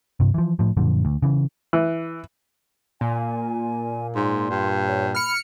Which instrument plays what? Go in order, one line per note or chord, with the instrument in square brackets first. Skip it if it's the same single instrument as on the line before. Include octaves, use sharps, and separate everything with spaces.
[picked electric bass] G2 C3
E3 F3
A2 F3
F#2 A#2 D3 F3
D2
C#3 E3
[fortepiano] E3
[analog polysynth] A#2 [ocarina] G#5
[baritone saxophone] G#2 [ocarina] C6
[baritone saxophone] G2
[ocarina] C#5
[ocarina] B5 [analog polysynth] F6 C#7